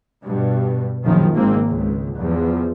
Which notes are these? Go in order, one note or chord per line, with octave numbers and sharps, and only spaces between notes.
G2 B2
A#1 F#2 D#3 F3
G#1 G#2 A#3 C4
C#2
E2 F3